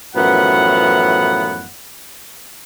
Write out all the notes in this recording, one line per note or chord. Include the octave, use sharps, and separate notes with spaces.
F#2 A2 E3 F3 B3 F#5